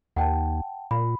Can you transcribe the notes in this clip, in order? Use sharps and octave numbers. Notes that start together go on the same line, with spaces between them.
D#2 F#5 G5 A5
A#2 B5